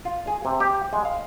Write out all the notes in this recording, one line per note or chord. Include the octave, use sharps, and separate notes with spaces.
F4
G#4
C3
G4
G#3
F5